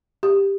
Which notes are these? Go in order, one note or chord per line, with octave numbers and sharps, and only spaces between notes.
G4